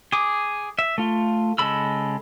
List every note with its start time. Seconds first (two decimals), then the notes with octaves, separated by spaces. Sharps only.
0.12 G#4 D6
0.79 E5
0.98 A3 F4
1.58 C#3 G#3 A4 B5 E6